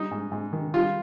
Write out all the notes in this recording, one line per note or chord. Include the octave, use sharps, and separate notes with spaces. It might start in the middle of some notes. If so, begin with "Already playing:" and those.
Already playing: G3 D#4
G#2
G#2
D#3
G3 F4